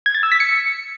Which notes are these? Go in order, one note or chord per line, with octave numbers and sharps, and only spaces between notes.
G#6
A6
E6
B6
C#7